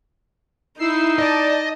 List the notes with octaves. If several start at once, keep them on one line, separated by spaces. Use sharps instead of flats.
D#4 E4 E6 C7
D5 D#5 A5